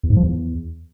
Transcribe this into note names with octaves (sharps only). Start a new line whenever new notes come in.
E2
G#2
F3
E2